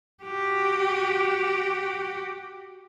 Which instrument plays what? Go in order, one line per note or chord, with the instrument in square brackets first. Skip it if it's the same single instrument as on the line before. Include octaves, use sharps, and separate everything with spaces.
[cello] F#4 G4